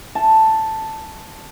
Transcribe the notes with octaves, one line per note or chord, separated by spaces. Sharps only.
A5